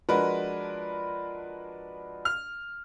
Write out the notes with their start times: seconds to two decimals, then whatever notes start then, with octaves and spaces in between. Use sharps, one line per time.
0.09 F3 G#3 D4 F#4 A#4 B4
2.25 F6